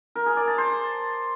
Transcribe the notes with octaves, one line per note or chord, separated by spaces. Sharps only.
A#4
G#4
D5
A5
C5